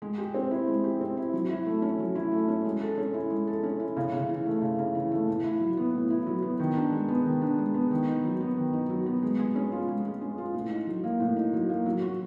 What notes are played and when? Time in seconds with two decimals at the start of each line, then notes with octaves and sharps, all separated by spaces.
0.02 G#3
0.18 G4
0.34 C4
0.51 E4
0.67 G#3
0.84 G4
1.01 C4
1.17 E4
1.33 F#3
1.50 E4
1.66 A3
1.82 C#4
1.99 F#3
2.15 E4
2.32 A3
2.48 C#4
2.65 G#3
2.81 A4
2.98 C#4
3.14 E4
3.30 G#3
3.47 A4
3.63 C#4
3.80 E4
3.97 C#3
4.13 C#3
4.29 E3
4.46 A3
4.62 C#3
4.78 C#3
4.95 E3
5.11 A3
5.28 A2
5.44 E4
5.61 F#3
5.77 B3
5.94 A2
6.10 E4
6.27 F#3
6.42 B3
6.59 D#3
6.76 D4
6.92 G#3
7.08 B3
7.25 D#3
7.42 D4
7.58 G#3
7.74 B3
7.91 D#3
8.07 D#4
8.24 F#3
8.40 B3
8.57 D#3
8.73 D#4
8.90 F#3
9.06 B3
9.23 G#3
9.39 G#3
9.56 C#4
9.72 F4
9.88 G#3
10.05 G#3
10.21 C#4
10.38 F4
10.54 A2
10.71 D#4
10.87 F#3
11.04 A#3
11.20 A2
11.36 D#4
11.53 F#3
11.69 A#3
11.86 F#3
12.02 F#4